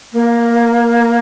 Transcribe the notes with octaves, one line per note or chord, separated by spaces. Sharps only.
A#3